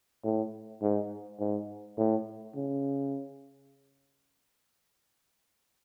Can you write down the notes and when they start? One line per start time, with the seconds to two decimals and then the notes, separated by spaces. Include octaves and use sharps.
0.25 A2
0.82 G#2
1.40 G#2
1.98 A2
2.56 C#3